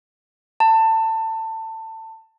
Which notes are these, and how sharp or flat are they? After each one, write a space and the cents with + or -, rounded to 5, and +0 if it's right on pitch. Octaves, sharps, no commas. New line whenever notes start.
A5 +25